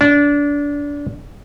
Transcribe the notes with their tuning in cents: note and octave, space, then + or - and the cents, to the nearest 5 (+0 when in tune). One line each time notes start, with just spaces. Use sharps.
D4 -25